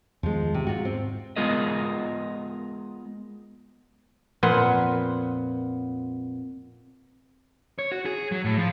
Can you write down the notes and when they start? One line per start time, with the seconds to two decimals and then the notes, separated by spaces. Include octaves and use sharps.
0.23 E2 D#3 F3 G#3
0.54 C3
0.67 G#2 G#3 F4 F#4
0.85 C4
1.36 G#3 B3 F4 G#4 A#4 D#5
4.43 F2 A#2 B3 F#5 G#5 C6
7.79 C#5
7.92 F#4
8.06 G#4
8.32 F#3
8.45 A2
8.57 F3